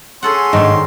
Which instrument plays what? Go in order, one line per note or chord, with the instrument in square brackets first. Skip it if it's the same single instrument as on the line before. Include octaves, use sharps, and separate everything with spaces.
[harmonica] C#4 C6 [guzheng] G#4 A4 F#5
[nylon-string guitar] G#2 [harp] D#3 D4